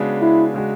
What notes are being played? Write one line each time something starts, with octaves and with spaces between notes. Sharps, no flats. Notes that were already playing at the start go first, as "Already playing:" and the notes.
Already playing: C#3 G#3 B3 D4 F#4
E4
C#3 G#3 D4 F#4